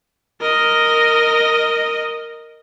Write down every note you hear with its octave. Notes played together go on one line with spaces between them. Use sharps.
A#4 D#5